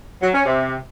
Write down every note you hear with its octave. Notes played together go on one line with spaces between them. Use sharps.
F#3
C#4
C3